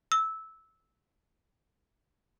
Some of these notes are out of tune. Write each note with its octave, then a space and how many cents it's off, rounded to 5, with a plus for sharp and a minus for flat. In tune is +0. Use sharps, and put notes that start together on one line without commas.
E6 -15